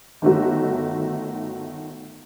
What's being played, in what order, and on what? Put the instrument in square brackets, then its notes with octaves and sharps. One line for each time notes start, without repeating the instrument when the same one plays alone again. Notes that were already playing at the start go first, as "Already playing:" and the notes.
[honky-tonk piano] G1 D#3 A3 F#4